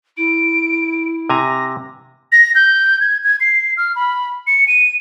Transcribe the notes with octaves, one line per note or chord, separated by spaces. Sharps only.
E4 D7
C3 G#5 A#5 A#6
A#6
G6
G#6
G#6
C7
F6
B5
C#7
D#7